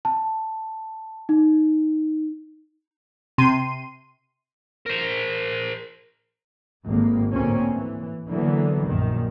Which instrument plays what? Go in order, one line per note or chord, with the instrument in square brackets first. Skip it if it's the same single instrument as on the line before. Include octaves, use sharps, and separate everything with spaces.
[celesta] A5
D#4
[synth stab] C3 C6 D#7
[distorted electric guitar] A#4 C5
[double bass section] G#1 A2 A#3
D2 A2 A#3 C4 C#4
E3
D3 E3 F#3 A#3 B3
A#1 F#2 D#3